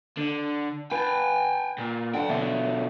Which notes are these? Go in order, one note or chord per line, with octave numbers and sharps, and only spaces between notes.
D3
B4 G5 G#5
A#2
D3 F#3 F5 G5
B2 D3 E5 C#6